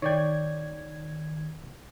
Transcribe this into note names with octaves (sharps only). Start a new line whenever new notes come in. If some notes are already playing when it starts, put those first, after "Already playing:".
D#3 C#5 D5 G5 G#6